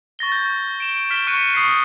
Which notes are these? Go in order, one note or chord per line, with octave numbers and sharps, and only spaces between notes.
C#6 A6 A#6 G7
G6
D7 E7 G7
F6 B6 E7 G7
C#6 F#6 C#7 D#7
C#6 D#6 G6 B6 C7